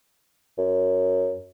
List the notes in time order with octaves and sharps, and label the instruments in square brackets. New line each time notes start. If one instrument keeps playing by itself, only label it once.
[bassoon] F#2